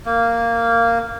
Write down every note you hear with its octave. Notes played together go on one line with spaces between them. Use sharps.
A#3